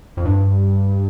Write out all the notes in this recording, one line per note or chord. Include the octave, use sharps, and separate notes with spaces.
F2
G2